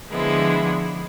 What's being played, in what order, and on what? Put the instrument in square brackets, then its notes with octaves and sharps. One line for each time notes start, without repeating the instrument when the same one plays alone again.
[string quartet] D3 F3 G#3 B3 E4